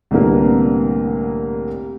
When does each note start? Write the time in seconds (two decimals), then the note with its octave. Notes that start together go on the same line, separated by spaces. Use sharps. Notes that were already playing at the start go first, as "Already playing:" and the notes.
0.11 C2 A2 D3 A#3 B3 A#4